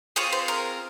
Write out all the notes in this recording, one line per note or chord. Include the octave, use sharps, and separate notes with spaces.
C4 F4 G#4 C#5
C5
A#4